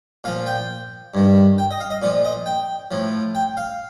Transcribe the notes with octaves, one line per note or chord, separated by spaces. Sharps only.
A#2 F3 F5
G5
G2 D#3
G5
D#5
F5
D#5
A#2 F3 D5
D#5
G5
A2 F3
G5
F5